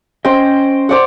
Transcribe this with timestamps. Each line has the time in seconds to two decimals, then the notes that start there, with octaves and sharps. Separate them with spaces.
0.25 C#4 C5 D#5 G5
0.89 C5 D5 F#5